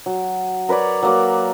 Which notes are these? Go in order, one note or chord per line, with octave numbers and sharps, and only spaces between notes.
F#3
A#4 B4 C#5 D5
F#3 A#3 D5